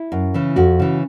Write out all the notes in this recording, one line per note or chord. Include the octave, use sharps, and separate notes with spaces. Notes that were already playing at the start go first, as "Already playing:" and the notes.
Already playing: E4
F#2
C#3 E3
F2 F#4
C#3 E3